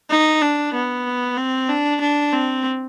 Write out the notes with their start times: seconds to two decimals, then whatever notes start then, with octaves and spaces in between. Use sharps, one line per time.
0.10 D#4
0.42 D4
0.74 B3
1.38 C4
1.69 D4
2.01 D4
2.33 C4